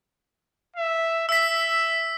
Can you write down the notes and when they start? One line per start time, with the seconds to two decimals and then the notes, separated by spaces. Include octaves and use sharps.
0.76 E5
1.29 E5 E6 B6